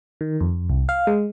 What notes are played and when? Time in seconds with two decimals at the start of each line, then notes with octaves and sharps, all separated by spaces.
0.21 D#3
0.41 F2
0.69 C2
0.89 F5
1.07 G#3